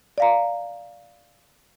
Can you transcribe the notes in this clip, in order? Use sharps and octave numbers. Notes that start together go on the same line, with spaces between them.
D5 F5 A#5